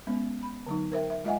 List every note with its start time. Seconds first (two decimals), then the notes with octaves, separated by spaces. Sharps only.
0.07 G#3 B3 C#4
0.43 B5
0.67 D3 F#3 D#4
0.92 A#4 C5 E5 G5
1.10 E5
1.24 G#3 F4 D#5 E5 F#5 G#5